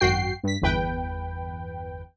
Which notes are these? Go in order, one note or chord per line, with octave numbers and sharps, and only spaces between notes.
G#1 F#2 F#4 G5 C7
G2 B6
G1 E2 B4 G5